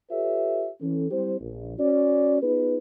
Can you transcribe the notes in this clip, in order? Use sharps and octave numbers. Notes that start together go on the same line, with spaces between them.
F4 G4 A4 B4 C#5 E5
E3 C#4 A4
G3 C4 E4 G4 C5
A#1
C#4 F#4 D5
B3 D#4 F4 G#4 B4